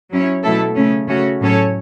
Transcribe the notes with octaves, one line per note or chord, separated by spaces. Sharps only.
F#3 C#4 E4 C#5
B2 F#3 A3 E4 A4
C#3 A3 C#4
C#3 A3 C#4 F#4
A2 F#3 C#4 A4 C#5